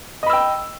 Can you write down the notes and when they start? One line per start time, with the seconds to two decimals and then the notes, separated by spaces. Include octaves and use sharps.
0.23 D#5
0.26 B5
0.30 E6
0.33 G5